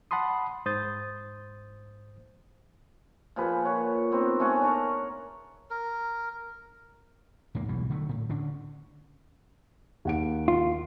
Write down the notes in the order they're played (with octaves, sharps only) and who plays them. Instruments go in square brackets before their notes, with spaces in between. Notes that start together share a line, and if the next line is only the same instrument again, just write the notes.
[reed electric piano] F#5 A5 B5 C6 D#6
G#2 C5 D#6 G6 A6
[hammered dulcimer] A#2 F3 G#4 B4
C#5 F#5
B3 C4 D#4
A3 C#4 G#4 F#5
D4 A#4 C#5 A#5
[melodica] A#4
[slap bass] D#2 G#2 A#3
B1 B2 E3 G3
D3 D#3 F#3 A3
A2
D3 C#4 D4
[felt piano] D#2 F#5 D7
[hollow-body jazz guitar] F4